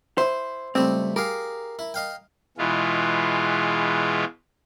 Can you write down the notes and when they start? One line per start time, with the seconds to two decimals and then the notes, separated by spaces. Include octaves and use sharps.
0.18 E4 C5
0.75 C#2 G3 A3 C4 E4
1.16 G4 G#4 A#4 F5
1.79 E4
1.94 D#5 F5 G5
2.58 B2 E3 G#3 F4